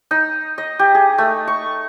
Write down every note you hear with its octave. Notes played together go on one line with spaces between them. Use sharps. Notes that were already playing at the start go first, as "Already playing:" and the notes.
D#4
D#5
G4
G#4
A3
C#6